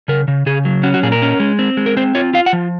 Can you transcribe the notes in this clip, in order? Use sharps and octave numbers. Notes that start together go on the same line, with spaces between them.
C#3 A#4
C#3
C#3 G#4
F#3
C#4 F#4
F#4
A#2 G#4
A#4
C#4
G#3
C4
G#3
A#4
C4 C5
F4 C#5
F4 F5
F#5
F3